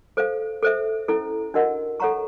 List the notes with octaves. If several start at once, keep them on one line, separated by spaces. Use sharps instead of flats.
A4 C5 F5
A4 C5 E5
C#4 E4 A4
D4 F#4 A#4 D#5 F#5
A4 C#5 F#5 A#5 C#6